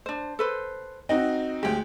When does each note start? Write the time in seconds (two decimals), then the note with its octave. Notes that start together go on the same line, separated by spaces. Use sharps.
0.06 D4 C5
0.39 A4 B4 C5
1.09 C4 D#4 F#4 D#5
1.63 D2 G#3 G4 G5